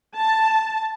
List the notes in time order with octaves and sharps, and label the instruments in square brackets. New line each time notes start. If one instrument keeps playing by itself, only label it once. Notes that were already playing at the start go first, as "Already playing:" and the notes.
[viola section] A5